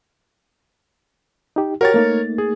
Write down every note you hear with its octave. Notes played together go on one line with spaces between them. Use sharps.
D#4 G4
F#4 G4 A#4 C#5 A6
A3 A#3 D#4
G#4